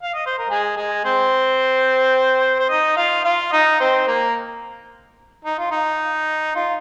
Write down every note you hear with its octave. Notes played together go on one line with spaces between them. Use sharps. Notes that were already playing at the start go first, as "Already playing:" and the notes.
F5
D#5
C5
A#4
G#3 G#4
G#3 G#4
C4 C5
C5
D#4 D#5
F4 F5
F4 F5
D#4 D#5
C4 C5
A#3 A#4
D#4
F4
D#4
F4